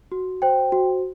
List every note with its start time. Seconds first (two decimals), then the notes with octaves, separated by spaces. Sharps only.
0.12 F#4
0.42 C5 G5
0.72 F#4